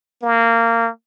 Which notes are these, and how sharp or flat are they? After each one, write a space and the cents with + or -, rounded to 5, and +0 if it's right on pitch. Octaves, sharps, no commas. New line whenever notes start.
A#3 -20